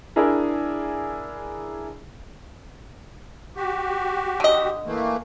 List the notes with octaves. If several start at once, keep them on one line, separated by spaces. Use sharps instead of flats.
D4 E4 G#4 A#4
F#4 G4
D3 D#5
E3 A3 A#3